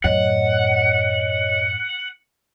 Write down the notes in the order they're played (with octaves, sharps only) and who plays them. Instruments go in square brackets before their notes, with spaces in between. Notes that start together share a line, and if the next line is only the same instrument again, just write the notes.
[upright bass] F#2 A2 [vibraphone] C#5 D#5 [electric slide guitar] F#5